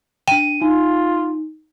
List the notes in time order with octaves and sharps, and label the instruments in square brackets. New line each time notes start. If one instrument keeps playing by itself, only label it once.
[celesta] D4 D#7 [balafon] G5
[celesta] D#4 [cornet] F4